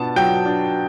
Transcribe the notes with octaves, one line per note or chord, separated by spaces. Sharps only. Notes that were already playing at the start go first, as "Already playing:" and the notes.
Already playing: B2 B3 D4 A5
F#3 G5
D4